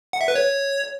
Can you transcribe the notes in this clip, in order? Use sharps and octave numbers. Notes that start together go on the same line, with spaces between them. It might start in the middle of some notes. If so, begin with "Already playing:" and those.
F#5
E5
B4
C#5